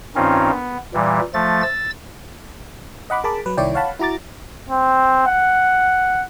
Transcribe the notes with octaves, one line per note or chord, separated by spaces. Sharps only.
G2 D#3 C4 C#4 D#4 F4
B3
A#2 E3 G3
F3 A3 A6
E6 A6
D#5 F#5 B5 D6
G#4 A#4 A5 B5 D6
F#3 B4
C2 D#3 E4 C#5 D5 G5
C#5 F5 F#5 A5 B5
E4 F#4 A#5 D6 A6
C4
F#5